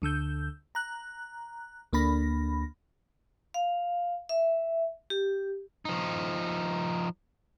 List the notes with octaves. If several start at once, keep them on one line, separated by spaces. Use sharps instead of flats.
D2 D3 E6 G6
A#5 F#6
D2 A#3 D4 B5 A#6
F5
E5
G4
F3 D#4